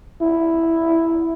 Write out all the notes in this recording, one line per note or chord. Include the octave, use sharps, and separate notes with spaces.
E4